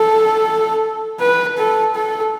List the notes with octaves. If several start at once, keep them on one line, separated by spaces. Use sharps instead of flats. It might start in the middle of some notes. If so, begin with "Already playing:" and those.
Already playing: A4
B4
A4
A4